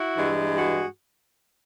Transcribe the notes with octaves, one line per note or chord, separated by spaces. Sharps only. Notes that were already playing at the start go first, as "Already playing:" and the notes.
Already playing: E4 F#4
G2 E3 G#3
F#4 G#4